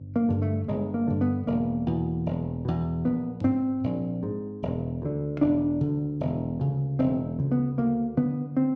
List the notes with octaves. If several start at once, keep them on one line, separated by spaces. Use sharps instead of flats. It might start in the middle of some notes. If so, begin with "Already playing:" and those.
Already playing: G1
A#3
G2 D3
A3
G1 G#3
A#3
G2 D3
B3
E1 A#3
E2 B2
E1
E2 B2
A#1 B3
G#2 C4
A#1
G#2
E1
D2 D3
E1 D4
D2 D3
E1
D2 C#3
E1 C4
D2 C#3
B3
D2 A#3
D3 B3
C4